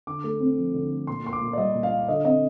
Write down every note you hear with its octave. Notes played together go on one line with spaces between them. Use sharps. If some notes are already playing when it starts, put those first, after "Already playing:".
D3 D6
A3
C4
F3
D3
A3
A#2 C6
A#3 C6
D6
A#2
D5
G3 D#5
A#2
F5
A#3
D3 D#5
C4 D#5